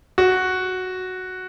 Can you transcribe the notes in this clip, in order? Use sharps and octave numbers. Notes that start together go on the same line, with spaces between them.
F#4